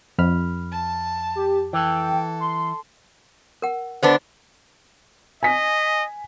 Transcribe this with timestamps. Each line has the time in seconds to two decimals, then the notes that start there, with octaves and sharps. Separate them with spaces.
0.18 F2 B5 F6
0.72 A5
1.35 G4
1.73 E3 A4 G5
2.40 C6
3.62 A#4 F#5
4.03 D3 B3 D4 C5
5.43 D#5 G#5 B6